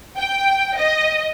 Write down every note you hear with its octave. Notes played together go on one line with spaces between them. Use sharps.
G5
D#5